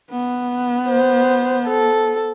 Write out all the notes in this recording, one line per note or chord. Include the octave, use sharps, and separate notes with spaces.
B3
C5
A4